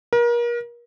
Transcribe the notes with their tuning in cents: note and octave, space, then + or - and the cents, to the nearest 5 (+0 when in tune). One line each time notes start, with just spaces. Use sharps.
A#4 +35